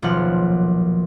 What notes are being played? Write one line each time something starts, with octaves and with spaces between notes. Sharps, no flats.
D#1 B1 A#2 F3 F#5 F6